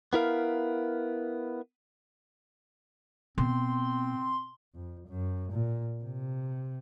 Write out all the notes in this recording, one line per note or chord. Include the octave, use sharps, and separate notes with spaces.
B3 E4 A#4 F5
B2 C4 C6
F2
F#2
A#2
C3